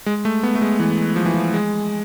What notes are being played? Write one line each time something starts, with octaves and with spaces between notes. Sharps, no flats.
G#3
A3
B3
A3
G#3
E3
F3
E3
F3
G#3